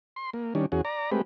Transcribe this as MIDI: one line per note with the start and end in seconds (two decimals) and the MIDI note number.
0.16 0.30 84
0.33 0.54 58
0.55 0.66 51
0.55 0.66 55
0.55 0.66 61
0.55 0.66 62
0.72 0.81 40
0.72 0.81 61
0.72 0.81 66
0.72 0.81 68
0.85 1.10 74
0.85 1.10 82
1.11 1.22 56
1.11 1.22 57
1.11 1.22 60
1.11 1.22 67
1.11 1.22 71